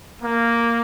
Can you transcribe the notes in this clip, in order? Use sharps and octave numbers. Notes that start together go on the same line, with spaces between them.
A#3